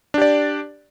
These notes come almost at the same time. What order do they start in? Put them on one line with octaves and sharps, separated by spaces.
D4 G4 D5